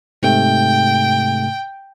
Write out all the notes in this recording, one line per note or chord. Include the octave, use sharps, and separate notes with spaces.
G#2 C3 A3 G5